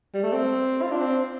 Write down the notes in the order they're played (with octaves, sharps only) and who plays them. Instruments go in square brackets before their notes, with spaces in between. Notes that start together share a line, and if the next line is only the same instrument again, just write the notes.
[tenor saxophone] G3
A3
C4
F4
D4
C4